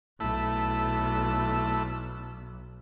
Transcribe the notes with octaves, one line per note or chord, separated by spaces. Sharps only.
B1 A3 E4